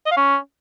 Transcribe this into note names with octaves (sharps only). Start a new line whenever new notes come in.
D#5
F5
C#4